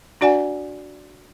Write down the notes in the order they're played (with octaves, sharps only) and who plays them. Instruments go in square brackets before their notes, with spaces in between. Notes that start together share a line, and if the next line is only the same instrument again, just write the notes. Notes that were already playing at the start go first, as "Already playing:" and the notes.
[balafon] D4 F#4 D5 F#5 G#5